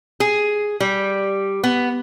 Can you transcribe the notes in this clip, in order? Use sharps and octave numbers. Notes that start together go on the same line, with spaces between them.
G#4
G3
B3